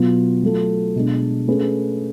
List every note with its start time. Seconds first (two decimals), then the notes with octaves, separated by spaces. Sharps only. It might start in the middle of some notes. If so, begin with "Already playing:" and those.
Already playing: B2 F#3 B3 F4
0.43 F#3 A3 F4 A4
0.96 B2 G#3 D4
1.48 A3 C#4 G#4 B4